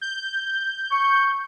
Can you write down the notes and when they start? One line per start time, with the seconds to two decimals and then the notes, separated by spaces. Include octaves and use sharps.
0.01 G6
0.91 C#6